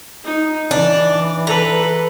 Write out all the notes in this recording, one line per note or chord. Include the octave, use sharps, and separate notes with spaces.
D#4
E3 D4 D5
A4 B4 A#5